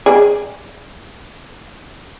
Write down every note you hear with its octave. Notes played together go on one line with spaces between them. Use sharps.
G#4 D5